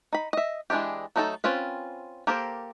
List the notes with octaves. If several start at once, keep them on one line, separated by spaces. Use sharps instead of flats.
D#4 B5
D#5 E5
E3 G#3 D4 F4 G4
F#3 A3 D#4 E4 A4
C4 C#4 F4 B4
A#3 G4 A4 A#4 C5